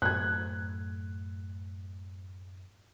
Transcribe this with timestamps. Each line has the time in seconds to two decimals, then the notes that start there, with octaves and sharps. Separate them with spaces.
0.02 F#2 A2 A3 F#6 G#6